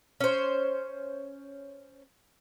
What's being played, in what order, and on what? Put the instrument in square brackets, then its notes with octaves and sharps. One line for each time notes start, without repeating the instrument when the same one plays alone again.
[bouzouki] C#4 C5